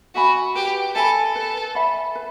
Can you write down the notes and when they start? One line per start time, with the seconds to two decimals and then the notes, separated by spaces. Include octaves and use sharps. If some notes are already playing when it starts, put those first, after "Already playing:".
0.15 F#4 E5 G#5 B5
0.55 G4 B4
0.95 A4 E5 G#5 B5
1.36 A4 B4
1.75 E5 G#5 B5
2.16 B4